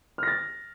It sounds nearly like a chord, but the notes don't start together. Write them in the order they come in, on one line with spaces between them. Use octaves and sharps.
F6 A#6 A6